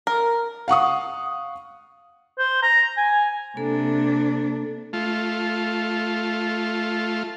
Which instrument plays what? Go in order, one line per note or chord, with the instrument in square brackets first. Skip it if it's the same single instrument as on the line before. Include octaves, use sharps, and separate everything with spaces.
[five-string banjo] A#4
[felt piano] F5 F#5 C#6 D#6
[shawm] C5
A#5
G#5
[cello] C3 D4 [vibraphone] A#3 A4
[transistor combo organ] A3 F4